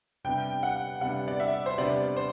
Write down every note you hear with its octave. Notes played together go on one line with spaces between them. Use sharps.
C3 G3 B3 D4 G5
F#5
C3 G3 B3 D4 F#5
D5
E5
C5
C3 G3 B3 D4 D5
C5